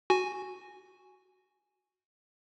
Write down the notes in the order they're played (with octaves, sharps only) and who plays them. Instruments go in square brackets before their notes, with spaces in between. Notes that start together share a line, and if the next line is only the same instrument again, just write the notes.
[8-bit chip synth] F#4 G#5